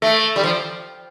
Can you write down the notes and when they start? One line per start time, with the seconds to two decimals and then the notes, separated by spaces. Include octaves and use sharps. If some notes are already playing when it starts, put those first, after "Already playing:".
0.02 A3 A4
0.36 G3
0.44 F3